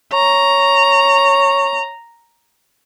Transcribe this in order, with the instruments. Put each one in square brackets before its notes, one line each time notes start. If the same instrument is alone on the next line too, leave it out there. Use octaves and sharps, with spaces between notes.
[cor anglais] C#5 [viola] A#5